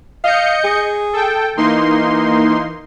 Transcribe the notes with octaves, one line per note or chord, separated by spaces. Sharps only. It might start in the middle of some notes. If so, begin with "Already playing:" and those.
D#5 F5 G6 C#7
G#4
A4 G5
E3 A#3 D#4 C6